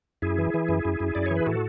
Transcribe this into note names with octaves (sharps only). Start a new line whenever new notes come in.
F#2 E4 G#4
E3
E3
F#2
F#2
F#2
F#2 D5
E3 C#5
B4
A2 F#4 A4